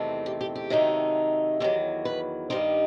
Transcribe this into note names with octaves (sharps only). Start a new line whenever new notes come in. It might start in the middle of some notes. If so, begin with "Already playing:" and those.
Already playing: E2 C3 D#3 A3 C4
G4
G4
G4
C3 D#3 F#3 A3 D#4
E2 D#3 F#3 G4
B4
G2 D#3 G3 D#4 C5